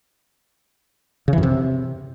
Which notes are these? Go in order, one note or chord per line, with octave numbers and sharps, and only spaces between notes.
C#3
E3
F#2
C3